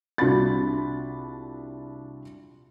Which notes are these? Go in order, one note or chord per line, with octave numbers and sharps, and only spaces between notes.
C2 D4 F4 F#4 B5 A6